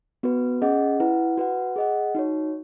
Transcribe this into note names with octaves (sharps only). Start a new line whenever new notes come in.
B3 F#4 B4
C#4 G#4 D#5 F#5
E4 B4 F#5
F#4 B4 F#5
G#4 D#5 F#5
D#4 F#4 C#5